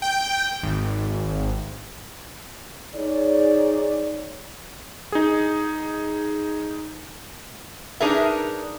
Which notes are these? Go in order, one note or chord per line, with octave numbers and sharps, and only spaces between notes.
G5
G#1
D#4 G#4 C#5 D5
D#4 G#4
D4 D#4 G#4 A#4 B4 E5